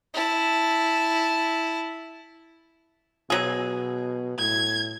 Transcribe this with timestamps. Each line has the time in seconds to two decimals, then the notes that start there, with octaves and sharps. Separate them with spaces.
0.14 E4 A5
3.30 B2 F#3 G#4
4.39 A2 G#6